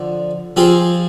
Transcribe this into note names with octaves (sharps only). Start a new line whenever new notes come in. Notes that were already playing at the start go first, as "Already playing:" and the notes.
Already playing: D3 F3
F3 C4 F4 G#4